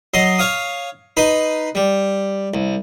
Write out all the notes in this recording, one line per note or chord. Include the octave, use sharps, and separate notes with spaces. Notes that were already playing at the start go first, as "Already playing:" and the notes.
F#3 D#5 C6
C#5 F5 D#6
D#4 B4 B5 C6
G3
C2